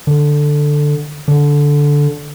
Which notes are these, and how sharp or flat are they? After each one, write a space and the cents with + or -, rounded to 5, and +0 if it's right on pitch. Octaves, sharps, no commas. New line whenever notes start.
D3 +5
D3 -10